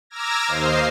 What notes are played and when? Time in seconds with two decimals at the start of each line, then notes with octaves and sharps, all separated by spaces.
0.10 A#5 D6 E6 F6 G#6 A#6
0.48 D#2 C5 D#5 F5 C7